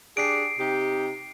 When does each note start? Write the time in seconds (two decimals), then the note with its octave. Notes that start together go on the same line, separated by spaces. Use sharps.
0.17 D4 G4 G#4 C7 D7
0.59 C3 D#4 G4